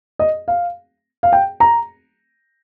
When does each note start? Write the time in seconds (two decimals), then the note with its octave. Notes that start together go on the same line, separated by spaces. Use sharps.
0.19 D#5
0.48 F5
1.23 F5
1.33 G5
1.60 A#5